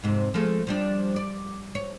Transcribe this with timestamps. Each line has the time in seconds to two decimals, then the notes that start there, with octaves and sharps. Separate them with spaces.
0.02 F2 G#2 C3
0.34 F3 G#3 A3
0.67 F3 G3 D4
1.16 D5
1.75 C#5